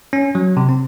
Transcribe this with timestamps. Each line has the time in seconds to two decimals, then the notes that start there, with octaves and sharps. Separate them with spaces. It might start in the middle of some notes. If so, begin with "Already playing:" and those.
0.13 C#4
0.35 F#3
0.57 C3
0.69 C4